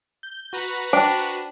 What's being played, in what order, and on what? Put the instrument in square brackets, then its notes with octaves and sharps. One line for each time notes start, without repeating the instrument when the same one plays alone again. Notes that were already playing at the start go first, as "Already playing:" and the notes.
[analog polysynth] G6
F#4 B4 A#5
[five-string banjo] D4 [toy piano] C5 G5